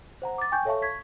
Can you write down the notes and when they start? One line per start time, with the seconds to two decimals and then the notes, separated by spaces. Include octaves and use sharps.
0.22 C5 F#5 A#5
0.38 D6 A6
0.52 G5 G#5 C#6 G6
0.65 A4 C#5 E5 F5 A5 C#6
0.82 C#6 G#6 B6